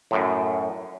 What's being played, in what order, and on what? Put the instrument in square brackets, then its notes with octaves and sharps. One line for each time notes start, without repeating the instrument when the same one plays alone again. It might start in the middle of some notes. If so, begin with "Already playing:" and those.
[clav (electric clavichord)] F#2 A2